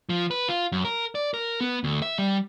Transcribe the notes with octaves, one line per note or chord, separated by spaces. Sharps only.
F3
B4
F4
F#2
A#4
D5
A#4
B3
D2
E5
G3